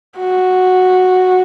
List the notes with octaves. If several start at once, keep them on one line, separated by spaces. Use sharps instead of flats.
F#4